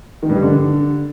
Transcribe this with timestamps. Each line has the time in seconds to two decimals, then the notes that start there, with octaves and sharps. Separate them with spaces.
0.23 D#3
0.29 G2
0.36 G3
0.43 D3